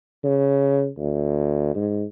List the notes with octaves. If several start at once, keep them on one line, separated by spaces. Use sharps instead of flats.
C#3
D2
G#2